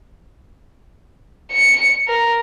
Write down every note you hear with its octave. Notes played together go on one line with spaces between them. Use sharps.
C#7
A#4